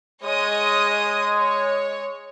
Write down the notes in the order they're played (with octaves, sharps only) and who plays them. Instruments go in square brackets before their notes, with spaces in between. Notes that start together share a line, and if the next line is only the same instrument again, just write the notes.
[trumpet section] G#3 [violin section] C#5 D#5 D#6
[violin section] C#5